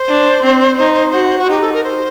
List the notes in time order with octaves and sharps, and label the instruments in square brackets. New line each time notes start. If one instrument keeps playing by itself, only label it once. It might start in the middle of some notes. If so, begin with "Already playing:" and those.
Already playing: [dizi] C5
[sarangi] D4
C4
D#4
F#4
[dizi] F#4
[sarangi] D#4 [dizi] G4
[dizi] A4
A#4
C5